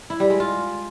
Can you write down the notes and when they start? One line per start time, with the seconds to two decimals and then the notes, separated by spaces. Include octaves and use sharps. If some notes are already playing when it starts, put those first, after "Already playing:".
0.10 E4
0.20 G3
0.30 G#3
0.40 F4